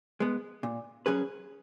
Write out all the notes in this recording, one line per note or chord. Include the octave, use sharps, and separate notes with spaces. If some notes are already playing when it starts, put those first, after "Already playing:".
G#3 B3
A#2
F#3 C#4 G#4 B4